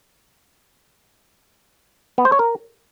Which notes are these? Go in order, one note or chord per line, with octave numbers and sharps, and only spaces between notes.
B3
C5
C#5
A#4